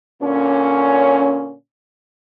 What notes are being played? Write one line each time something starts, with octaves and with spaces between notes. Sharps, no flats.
A#2 D3 C#4